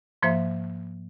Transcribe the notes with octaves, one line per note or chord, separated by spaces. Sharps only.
G#2 F3 A#3 C5 E5